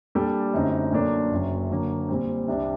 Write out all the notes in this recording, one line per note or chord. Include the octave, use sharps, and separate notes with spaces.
A#2 G3 D4 A4
F#2 D3 A3 C4 D#4
A#2 F#3 A#3 D4 A4
F#1 F#2 F#3
D3 F#3 A#3
A#2 G3 C4
C2 C3 G3 D4